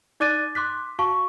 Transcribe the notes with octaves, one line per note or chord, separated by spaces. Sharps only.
D#4 D5 D6 F#6 A6 D#7
C6 D6 F#6 B6
F#4 F5 A5 C#6